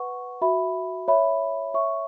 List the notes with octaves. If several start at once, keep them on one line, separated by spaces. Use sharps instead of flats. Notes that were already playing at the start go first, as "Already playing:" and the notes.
Already playing: B4 F#5 C#6
F#4 E5 B5
C#5 E5 B5
C#5 E5 C#6